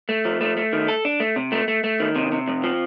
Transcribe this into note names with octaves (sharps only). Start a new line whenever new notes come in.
A3
F3
A3
A3
D#3
A4
D4
A3
C3
A3
A3
A3
D#3
C3
C3
F2
F3